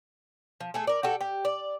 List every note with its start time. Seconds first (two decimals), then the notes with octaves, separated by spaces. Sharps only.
0.60 F3
0.74 A3 G#4 A4
0.87 A#4 D5
1.03 F#4 G4 A4
1.21 G4
1.45 D5